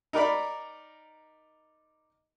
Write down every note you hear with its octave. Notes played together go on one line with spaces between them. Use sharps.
D#4 A#4 D5 B5